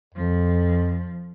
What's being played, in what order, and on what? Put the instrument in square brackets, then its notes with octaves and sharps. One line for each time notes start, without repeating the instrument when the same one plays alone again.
[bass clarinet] F2 [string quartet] F3